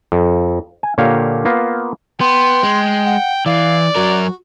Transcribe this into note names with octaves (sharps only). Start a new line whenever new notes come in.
F2
G#5
A#2 D3 A#3 G4 C#5 F5
A#3 B3 F4
B3 G5 C6
G#3
F#5
E3 D5 F5
F#3 F#4 A#4